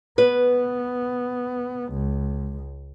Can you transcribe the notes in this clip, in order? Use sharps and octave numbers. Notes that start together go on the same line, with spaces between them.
B3 B4
C#2